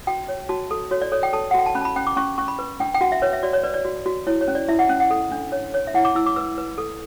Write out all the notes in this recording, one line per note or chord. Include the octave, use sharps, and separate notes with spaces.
F#4 G5
C#5
F#4 A5
A4
F#4 C#5
D5
A4 C#5
G5
A4 A5
F#5
F#4 G5
A5
C#4 B5
A5
B5
C#4 G5
D6
C#4 C#6
C#4 C#6
B5
B4
D4 G5
G5
F#4 F#5
E5
B4 C#5
E5
F#4 D5
C#5
B4 D5
D5
F#4
F#4
E4 C#5
C#5
C#4
D5
E4 E5
F#5
C#4
F#5
A4
D4
C#5
C#5
E5
E4 F#5
D6
E4 E6
D6
B4 E6
B4
A4